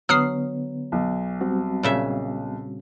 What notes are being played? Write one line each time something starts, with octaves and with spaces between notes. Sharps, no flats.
D3 F#3 B3 D#6 F6 C7
B1
G3 C4 F#4
A#2 C#3 E5